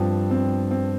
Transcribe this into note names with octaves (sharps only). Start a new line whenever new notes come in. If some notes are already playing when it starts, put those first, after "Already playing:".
Already playing: G2 F3 C4
C4
C4